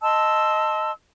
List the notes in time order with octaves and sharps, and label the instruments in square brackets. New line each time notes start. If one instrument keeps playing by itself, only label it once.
[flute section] D#5 A5 C6 E6